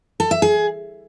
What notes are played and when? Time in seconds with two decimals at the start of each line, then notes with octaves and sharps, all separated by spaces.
0.20 A4
0.31 E5
0.42 G#4